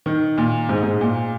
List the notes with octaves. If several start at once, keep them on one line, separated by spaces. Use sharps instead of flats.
D#3
A#2
G#2
G#2
A#2